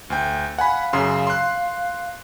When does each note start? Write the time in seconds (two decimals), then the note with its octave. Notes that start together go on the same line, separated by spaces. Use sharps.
0.10 D2 G5
0.58 F5 F#5 G#5 B5
0.93 F#2 C#3 C6
1.27 C6 F#6